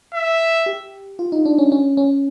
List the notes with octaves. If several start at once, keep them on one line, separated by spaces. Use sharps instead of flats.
E5
G4
F4
D#4
D4
C#4
C#4
C#4